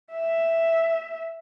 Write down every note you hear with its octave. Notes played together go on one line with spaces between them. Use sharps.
E5